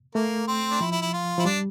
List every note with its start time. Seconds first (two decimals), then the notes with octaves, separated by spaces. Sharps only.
0.15 A3 A#3
0.47 C4
0.71 D4
0.81 F3 E4
0.92 E4
1.02 E4
1.13 F4
1.38 F3 E4
1.45 G3 D4